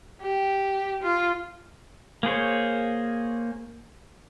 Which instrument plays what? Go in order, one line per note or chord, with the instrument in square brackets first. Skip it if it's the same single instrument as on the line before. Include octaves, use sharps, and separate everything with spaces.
[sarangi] G4
F4
[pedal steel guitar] A#3 G#4 C5 C#5